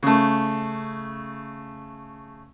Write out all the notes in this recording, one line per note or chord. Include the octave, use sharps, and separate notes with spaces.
C#3 A3